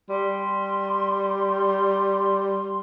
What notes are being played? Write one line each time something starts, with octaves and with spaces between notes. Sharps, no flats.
G3 C6